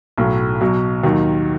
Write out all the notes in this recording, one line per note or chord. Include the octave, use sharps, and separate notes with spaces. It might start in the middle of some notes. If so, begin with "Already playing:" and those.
B1 A2 F#3 A3
B1 B2 F#3
D#2 D#3 F#3